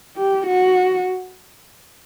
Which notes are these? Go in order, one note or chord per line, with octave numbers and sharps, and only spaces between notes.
G4
F#4